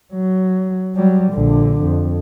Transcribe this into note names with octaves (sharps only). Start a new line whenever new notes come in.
F#3
F#3 G3
A#1 D3
F2